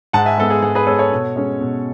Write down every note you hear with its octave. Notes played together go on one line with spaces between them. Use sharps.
G#2 F#5 A5
E5 G#5
G#3 B3 A4
G#4
G#2 G#4
G#4 B4
G#3 B3 A4 C#5
A4 C#5
B2
G#3 C#4
B2